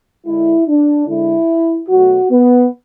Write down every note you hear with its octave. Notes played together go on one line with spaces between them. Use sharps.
D3 G#3 E4
D4
D3 G#3 E4
B2 F#3 A3 F#4
B3